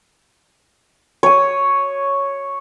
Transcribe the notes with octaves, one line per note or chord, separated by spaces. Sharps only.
C#5 D#6